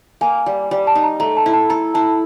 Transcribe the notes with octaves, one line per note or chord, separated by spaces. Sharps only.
A#3 G#5
G3
G3
A5
D#4
A#5
A3 A#5
A5
E4
A5
A4 A#5
E4 A5